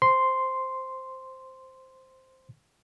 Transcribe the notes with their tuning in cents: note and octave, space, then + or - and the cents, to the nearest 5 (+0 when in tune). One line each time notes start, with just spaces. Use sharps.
C5 +0 C6 -5